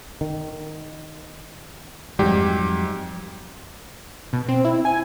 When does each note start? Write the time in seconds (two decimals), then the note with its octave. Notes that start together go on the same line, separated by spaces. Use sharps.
0.21 D#3
2.19 F2 G#2 F#3 G3 G4
4.33 B2
4.49 C4
4.65 E4
4.85 G#5